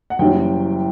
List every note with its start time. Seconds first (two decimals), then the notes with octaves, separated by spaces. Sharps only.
0.10 F#5
0.19 F#1 F#2 E3 G3 C#4 G5